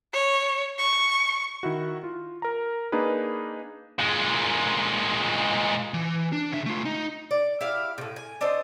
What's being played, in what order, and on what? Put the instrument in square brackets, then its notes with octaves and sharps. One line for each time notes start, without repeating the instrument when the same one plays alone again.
[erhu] C#5
C#6
[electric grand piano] D#3 E4 F#4
F4
A#4 A#5
A#3 D4 D#4 G#4 B4
[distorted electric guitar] A#2 G#3
[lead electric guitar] E3
D4
C#3 E5
A3 F4
D#4
[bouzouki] D5
E4 G4 F5
A2 C3
G#5
D4 A4 C5 D#5